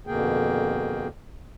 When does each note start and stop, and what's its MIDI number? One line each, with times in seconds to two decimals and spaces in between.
0.07 1.08 41
0.07 1.08 47
0.07 1.08 50
0.07 1.08 58
0.07 1.08 68
0.07 1.08 79